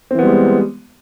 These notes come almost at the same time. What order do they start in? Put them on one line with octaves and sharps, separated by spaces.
C4 E3 B3 G3 G#3